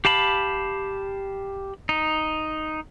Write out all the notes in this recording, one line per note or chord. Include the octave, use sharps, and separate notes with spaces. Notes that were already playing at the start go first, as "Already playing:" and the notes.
G4 F5 A5 B5
D#4